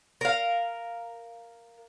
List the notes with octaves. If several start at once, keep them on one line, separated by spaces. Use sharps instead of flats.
A#4 F5